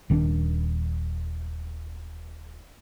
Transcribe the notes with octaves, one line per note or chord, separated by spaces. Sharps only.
D#1 D#3 C#4 D4